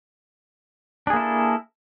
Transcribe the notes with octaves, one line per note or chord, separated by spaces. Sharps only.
A#3 D4 E4 G#4 A4